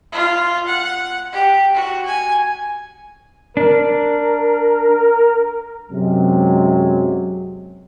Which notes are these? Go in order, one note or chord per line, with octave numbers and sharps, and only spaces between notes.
F4
F#5
G4
F#4
G#5
D4 A#4
F#2 C3 F#3 G#3